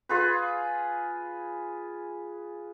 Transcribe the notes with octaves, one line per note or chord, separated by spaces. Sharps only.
F4 G#4 B4